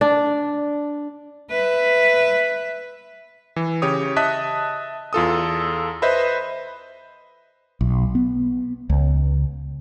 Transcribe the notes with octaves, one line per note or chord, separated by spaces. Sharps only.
D4
B4 E5
E3
C#3 G4 C#5 D#6
D#5 E5 A5 D#6 F#6 B6
E2 F4 A4 D#6
B4 C5 D#5 E5 B5
B1
B3
C#2